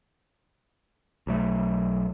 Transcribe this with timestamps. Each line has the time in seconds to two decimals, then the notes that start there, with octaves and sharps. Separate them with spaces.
1.27 B1 F#3 A3